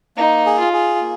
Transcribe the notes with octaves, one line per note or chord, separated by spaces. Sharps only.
A#3 D#4
G#4
F4
G#4
A#3